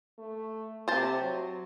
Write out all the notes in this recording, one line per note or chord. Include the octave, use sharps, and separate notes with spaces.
A3
C3 C5 A5
F#3